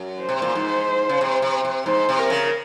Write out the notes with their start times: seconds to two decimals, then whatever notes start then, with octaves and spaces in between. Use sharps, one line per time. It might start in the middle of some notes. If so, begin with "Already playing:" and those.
Already playing: F#2
0.22 C5
0.29 C3
0.42 A#2
0.55 G#2
1.09 C#3
1.21 C3
1.42 C3
1.65 C3
1.86 G#2 C5
2.09 C3
2.19 A#4
2.30 C#3